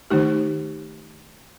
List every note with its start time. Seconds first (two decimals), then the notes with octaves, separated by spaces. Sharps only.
0.10 D#3 A3 D#4 G4